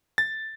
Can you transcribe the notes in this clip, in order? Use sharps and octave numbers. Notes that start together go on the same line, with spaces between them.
A6